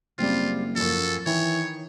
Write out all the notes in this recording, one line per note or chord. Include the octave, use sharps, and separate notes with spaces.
F#1 G3 C4 F4
F#2 F3 A4
D#3 E3 C#5